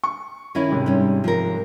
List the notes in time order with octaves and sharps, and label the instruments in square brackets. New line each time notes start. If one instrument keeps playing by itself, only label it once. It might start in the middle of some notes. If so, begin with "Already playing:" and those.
[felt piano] C#6
[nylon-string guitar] D#3 C#4 E4
[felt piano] B1 G#2 C3
[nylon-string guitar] G3 C#4
F3 A#4